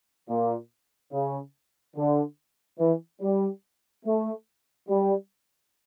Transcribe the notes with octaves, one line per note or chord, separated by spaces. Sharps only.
A#2
C#3
D3
E3
G3
A3
G3